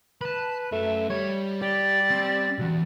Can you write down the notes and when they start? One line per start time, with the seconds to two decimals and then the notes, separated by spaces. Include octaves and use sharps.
0.21 B4 A5 B5
0.72 F#2 A3
1.10 G3 C#5
1.62 G3 G4 A6
2.10 C4
2.59 B1 E2 F#4